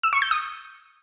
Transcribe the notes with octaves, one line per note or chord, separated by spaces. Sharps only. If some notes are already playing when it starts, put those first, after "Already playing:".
E6
C#6
G6
D#6